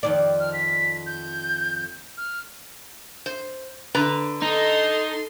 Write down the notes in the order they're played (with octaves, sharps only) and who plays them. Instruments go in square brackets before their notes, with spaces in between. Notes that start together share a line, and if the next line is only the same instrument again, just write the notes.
[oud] F2 D#3 D5
[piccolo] F6
B6
G6
F6
[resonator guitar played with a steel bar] C5
D3 B4 A#5
[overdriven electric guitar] D#4 [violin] A4 C6